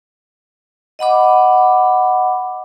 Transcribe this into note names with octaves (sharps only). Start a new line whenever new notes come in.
D#5 F#5 B5 D6